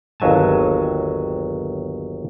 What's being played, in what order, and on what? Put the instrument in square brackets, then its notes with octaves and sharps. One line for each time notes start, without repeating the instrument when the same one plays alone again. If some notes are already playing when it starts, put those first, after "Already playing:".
[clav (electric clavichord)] G1 D#2 F#3 G#5 A5